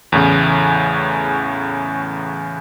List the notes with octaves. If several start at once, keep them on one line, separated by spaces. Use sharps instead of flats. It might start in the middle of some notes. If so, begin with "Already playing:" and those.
E2 A2 C#3